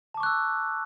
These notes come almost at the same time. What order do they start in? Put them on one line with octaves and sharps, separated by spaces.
A5 D6 C#6 F#6 E6